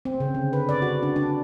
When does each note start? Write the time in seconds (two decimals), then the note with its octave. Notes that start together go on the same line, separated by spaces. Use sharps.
0.05 C4
0.20 C#3
0.35 D3
0.53 B4
0.69 D5
0.82 F#4
1.03 D4
1.16 D4